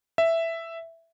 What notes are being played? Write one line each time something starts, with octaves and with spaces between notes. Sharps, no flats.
E5